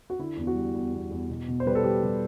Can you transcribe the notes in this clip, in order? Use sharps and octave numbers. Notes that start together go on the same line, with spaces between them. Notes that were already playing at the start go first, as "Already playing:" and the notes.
F#4
D3 E4
E2 E4
F#4
G3
E2
E2
E2
B2
B2
C5
G3 B4
A4
G3 G4
G3